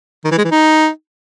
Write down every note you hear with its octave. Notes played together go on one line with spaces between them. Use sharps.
D#3
E3
G#3
E3
D#4